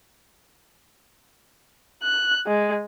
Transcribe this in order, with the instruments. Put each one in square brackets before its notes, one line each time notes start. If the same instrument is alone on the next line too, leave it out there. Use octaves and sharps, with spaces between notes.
[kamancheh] F#6
G#3